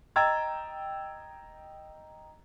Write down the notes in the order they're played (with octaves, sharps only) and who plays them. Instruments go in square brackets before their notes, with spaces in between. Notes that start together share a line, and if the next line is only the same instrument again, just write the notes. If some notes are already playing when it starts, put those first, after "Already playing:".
[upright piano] D#5 G5 A#5 E6 G#6 A6